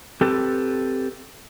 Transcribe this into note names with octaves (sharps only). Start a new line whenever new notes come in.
C4 G4 A4 B4